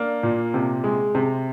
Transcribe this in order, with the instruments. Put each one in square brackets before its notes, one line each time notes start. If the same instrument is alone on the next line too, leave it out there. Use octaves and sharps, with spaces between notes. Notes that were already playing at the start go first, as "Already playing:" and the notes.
Already playing: [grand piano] A#3 D4
A#2
C3
G#3
C3